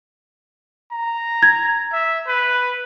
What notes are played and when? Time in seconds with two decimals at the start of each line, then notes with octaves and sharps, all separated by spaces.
0.92 A#5
1.43 G#6
1.93 E5
2.27 B4